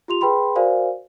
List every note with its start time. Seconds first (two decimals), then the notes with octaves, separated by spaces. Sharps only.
0.08 F4 G4 C6 F7
0.21 G#4 B4 G5 B5 C6
0.56 F#4 A#4 C5 D5 F5 G#5